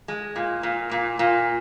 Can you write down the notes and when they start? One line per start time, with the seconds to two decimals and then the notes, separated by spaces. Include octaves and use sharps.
0.08 G#3
0.36 A#2
0.63 A#2
0.91 A#2
1.19 A#2